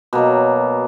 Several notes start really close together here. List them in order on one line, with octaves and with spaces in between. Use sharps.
B2 A#3 F#3